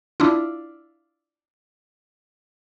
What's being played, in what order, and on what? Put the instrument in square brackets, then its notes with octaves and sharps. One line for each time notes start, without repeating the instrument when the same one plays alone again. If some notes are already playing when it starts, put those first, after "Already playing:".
[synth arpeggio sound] D4 E4 F4